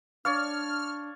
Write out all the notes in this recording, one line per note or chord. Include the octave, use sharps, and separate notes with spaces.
D4 C#5 D5 F5 F6